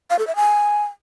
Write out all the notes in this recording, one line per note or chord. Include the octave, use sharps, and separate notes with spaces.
F5
A4
E5
G#5